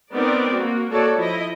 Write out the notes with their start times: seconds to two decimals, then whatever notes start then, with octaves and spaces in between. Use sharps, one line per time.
0.13 B3 C4 D#4 A#4 B4 D5
0.55 A#3 F#4
0.90 A#3 F#4 A4 C#5 D5 A5
1.19 F3 E4 D#5